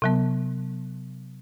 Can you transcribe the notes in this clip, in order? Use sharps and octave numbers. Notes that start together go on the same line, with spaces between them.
C3 F#3 B3